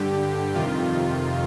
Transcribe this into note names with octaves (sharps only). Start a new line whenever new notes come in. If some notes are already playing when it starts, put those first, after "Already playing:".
Already playing: G2 D3 G4
F2 C3 D#3 F4